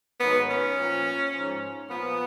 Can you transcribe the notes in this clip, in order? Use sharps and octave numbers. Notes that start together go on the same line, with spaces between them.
G#2 D#3 F#3 B3
C#4
A#2 F3
G#2 F3
A#2 F3 B3